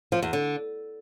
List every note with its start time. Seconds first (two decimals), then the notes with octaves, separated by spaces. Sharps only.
0.12 F3
0.23 E2
0.33 D3